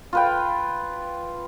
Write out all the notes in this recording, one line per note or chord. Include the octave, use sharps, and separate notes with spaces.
F4 B4 G5